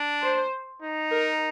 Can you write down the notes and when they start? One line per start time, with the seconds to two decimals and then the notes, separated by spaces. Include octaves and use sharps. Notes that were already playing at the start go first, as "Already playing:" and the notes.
Already playing: D4
0.22 C5
0.82 D#4
1.11 A#4